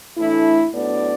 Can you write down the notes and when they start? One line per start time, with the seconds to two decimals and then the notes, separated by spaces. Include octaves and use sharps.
0.17 A2 E3 A3 D4 E4
0.73 A2 F#3 B3 D4 D5